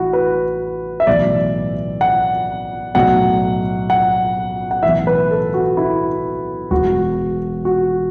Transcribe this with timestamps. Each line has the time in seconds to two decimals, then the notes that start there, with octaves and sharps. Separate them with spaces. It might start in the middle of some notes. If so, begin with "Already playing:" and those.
Already playing: A1 A2 E3 E4 F#4
0.13 B4
1.00 E5
1.07 B1 A2 E3 D5
2.01 F#5
2.95 B1 A2 F#3 F#5
3.90 F#5
4.71 F#5
4.83 B1 A2 E3 E5
5.07 B4
5.31 A4
5.54 F#4
5.77 E4
6.71 E1 E2 E3 F#4
7.65 F#4